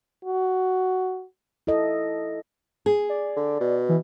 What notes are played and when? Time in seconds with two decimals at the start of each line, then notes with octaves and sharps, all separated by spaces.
0.25 F#4
1.67 E4 A4 D#5
2.86 G#4
3.09 D5
3.36 D3
3.60 B2
3.89 E3